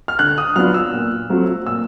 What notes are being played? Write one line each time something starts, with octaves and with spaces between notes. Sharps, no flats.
F6
D3 F#6
D#6
F#3 B3 D4 F4 F6
E6
A#2
F#3 A3 C4 F4
A#2 E6